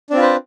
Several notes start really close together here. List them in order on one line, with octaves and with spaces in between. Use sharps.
D4 C4 F4 B4 C5